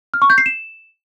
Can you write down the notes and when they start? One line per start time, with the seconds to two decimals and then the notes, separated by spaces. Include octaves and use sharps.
0.14 F6
0.22 C#6
0.30 G6
0.38 C7
0.46 E7